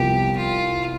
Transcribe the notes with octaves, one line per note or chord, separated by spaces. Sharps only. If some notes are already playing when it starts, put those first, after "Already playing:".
Already playing: C2 C3 F3 B3 G4
F4